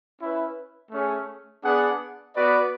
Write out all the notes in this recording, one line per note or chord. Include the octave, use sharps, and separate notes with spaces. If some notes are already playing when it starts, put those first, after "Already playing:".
C#4 E4 B4
A3 C#4 G#4
B3 D4 G#4 D5 F#5
B3 F#4 B4 D5